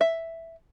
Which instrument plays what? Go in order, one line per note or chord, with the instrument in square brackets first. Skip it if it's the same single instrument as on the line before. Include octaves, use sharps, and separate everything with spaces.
[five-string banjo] E5